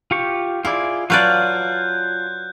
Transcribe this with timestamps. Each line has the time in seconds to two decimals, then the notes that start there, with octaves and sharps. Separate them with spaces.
0.11 F4 G4 C#6
0.65 E4 F4 G#4 D5
1.10 F#3 F4 B4 D5 F5 A5 F#6 G6